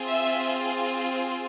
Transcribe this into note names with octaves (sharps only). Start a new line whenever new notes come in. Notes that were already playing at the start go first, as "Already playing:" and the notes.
Already playing: C4 F4 G#4
E5